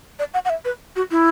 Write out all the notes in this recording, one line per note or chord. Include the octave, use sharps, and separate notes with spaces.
D5
F#5
F#5
E5
B4
F#4
E4